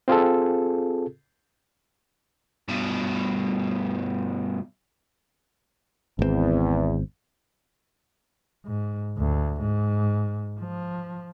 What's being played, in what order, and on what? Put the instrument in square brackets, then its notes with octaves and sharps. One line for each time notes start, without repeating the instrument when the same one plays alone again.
[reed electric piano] C4 F4 G#4 A4
[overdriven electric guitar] G2 B2
[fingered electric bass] G#1 C3 C4 [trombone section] E2
[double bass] G#2
D2
G#2
F3